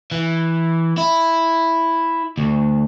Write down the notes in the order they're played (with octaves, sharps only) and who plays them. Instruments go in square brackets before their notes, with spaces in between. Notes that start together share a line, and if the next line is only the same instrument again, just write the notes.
[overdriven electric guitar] E3
E4
D2